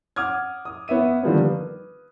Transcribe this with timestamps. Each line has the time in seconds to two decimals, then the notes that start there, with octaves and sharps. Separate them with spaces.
0.16 F#5 D6 D#6 F6 G#6
0.65 D#6
0.88 B3 C#5 E5 D#7
1.23 D3 D#3 F3 G3 A#3 B3
1.44 B4